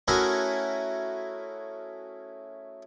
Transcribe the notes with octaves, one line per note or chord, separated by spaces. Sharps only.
A3 C#4 E4 F#4 G#4 A#4